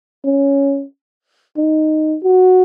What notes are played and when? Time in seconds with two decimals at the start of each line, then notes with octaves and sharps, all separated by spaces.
0.25 C#4
1.57 D#4
2.23 F#4